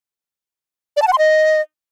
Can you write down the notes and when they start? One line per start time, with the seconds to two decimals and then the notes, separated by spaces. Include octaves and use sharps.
0.97 D5
1.02 A5
1.07 F#5
1.13 C6
1.18 D#5